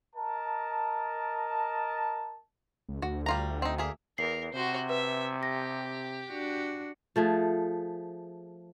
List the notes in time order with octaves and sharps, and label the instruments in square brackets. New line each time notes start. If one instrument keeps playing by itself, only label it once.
[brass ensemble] A#4 D#5 A5
[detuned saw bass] C#2
[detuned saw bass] D2 [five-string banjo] F#4
[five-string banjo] G3 F4 A#5
C4 D#4
A#3 G#4 E5
[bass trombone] E2 [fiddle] A#4 [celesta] C7
[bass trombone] C3 [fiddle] F#4 C5
[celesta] B4 [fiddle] E5
[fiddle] G4 [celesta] A#6
[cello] D4 F#4
[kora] F3 A3 G#4